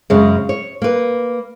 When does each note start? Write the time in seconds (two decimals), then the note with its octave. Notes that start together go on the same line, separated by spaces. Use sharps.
0.10 F#2 C#3 G#3
0.49 C#5
0.82 A#3 B4